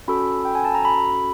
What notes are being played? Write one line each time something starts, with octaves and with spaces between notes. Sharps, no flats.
C#4 F#4 A4 B5
G5
G#5
A5
A#5
B5